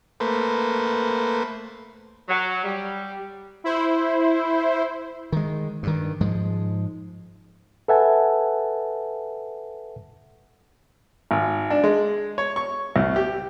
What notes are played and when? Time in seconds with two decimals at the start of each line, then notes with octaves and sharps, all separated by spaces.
0.20 A3 A#3 B4 C5
2.28 F#3
2.63 G3
3.64 E4 C5
5.32 D#3 G#3
5.83 G2 D#3
6.21 G#2 F3 G#3
7.88 A4 B4 E5 F#5 G#5 A5
11.31 G#1
11.70 D4
11.84 G#3
12.38 C#5
12.56 C#6
12.96 C2
13.16 G4